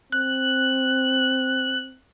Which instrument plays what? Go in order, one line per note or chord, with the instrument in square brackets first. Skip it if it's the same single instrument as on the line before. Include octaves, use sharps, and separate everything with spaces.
[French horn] C4 [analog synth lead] F#6